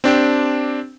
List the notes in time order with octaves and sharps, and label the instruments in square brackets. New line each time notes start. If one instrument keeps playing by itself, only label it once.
[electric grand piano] C4 D4 G4